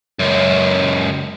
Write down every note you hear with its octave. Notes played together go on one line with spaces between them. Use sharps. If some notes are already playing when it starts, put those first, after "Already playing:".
C#2 F#2